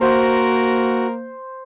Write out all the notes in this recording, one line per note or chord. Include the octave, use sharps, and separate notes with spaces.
A#3 F#4 A#4 C5